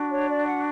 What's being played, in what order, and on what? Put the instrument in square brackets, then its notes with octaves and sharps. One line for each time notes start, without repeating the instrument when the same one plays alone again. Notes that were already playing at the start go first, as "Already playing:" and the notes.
Already playing: [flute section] D4 F#4
C#5
D5
F#5